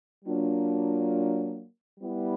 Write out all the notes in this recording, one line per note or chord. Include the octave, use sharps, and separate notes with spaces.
F#3 A#3 D4 F4
G3 B3 E4